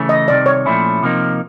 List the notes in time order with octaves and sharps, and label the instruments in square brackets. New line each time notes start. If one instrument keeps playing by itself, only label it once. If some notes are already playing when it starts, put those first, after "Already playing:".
Already playing: [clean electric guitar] C#3 E3 A3 C#4
[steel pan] D#5
[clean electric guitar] C2 C3 D#3 [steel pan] D5
[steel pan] C#5
[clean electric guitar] A#2 F3 A3 C#4 E4
C3 F3 A#3 D#4